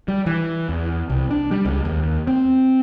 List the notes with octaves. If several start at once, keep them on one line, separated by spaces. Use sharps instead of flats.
G3
E3
E2
C2
D4
G3
C#2
D#2
C4